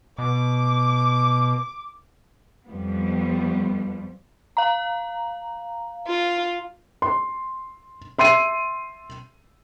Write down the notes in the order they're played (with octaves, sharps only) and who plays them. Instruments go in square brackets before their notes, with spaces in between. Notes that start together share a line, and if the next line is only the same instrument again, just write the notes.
[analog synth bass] B2 [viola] D6
[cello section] F2 G3 B3
[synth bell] F5 A#5
[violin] F4
[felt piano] C6
E5 C6 C7 D#7